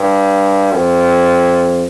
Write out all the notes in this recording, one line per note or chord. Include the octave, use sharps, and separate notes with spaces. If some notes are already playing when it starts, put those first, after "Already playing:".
Already playing: G2
F2